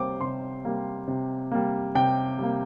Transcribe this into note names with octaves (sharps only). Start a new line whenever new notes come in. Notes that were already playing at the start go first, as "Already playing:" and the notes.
Already playing: C3 G3 A#3 C5 D6
C3 C6
G3 A#3
C3
G3 A#3
C3 G5
G3 A#3